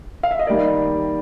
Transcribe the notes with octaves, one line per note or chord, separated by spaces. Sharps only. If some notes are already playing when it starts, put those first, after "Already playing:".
F5
E5
D#5
D#3 G3 A#3 D5